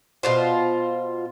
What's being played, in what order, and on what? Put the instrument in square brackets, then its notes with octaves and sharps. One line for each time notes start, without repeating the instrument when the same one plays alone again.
[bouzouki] B2 F4 C5